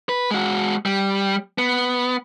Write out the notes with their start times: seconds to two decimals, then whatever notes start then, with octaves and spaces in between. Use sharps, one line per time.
0.09 B4
0.31 G#3 F#4
0.86 G3
1.58 B3